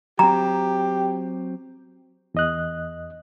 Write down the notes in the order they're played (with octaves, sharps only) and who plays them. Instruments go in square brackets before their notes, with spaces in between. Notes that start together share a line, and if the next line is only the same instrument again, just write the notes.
[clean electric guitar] F#3 C4 [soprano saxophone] G4 [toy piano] A#5
[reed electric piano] E2 D#5 F#6